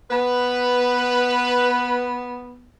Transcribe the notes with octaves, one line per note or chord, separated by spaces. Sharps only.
B3 B4